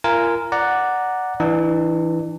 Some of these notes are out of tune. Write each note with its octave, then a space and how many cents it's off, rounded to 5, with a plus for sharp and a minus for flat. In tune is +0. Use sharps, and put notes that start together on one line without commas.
F4 -35 A#4 +0 G#5 -5
D5 +0 F#5 +0 A#5 +0
E3 +0 D4 +45